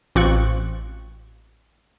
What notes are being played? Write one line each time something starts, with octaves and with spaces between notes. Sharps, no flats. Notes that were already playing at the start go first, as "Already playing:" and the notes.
A1 C4 F4 C#6 F#6